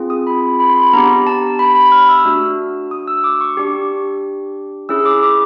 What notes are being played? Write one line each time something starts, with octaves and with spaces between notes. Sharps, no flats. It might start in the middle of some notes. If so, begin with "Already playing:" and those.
Already playing: C4 F4 G#4
D#6
B5
B5
C6
B5
B3 D4 G4 A#5
A5
B5
B5
F6
E6
A3 D4 F#4
D#6
E6
D6
C#6
D4 G4
C#4 E4 G#4 E6
D6
D6